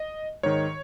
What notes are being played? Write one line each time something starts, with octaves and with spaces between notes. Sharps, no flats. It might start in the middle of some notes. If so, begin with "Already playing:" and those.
Already playing: D#5
G#2 D#3 C#5